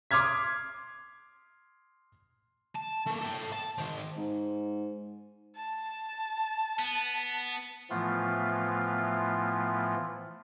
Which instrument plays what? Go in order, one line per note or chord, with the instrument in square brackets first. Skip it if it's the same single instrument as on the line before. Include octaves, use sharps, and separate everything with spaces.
[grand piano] C6 D6 D#6 F6 G#6 B6
[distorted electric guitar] A5
A3 A#3
A4 G5
A5
D#3 C4
[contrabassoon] G#2
[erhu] A5
[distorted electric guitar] B3
[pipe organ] A2 E3 F3 A3 B3 F4